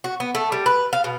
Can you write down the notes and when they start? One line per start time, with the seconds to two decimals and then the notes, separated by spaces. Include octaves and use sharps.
0.04 F#4
0.20 B3
0.35 A3
0.52 G3
0.66 B4
0.93 F5
1.04 B2